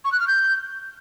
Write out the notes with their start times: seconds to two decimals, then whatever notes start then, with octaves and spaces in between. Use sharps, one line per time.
0.05 C#6
0.12 F#6
0.20 F6
0.28 G6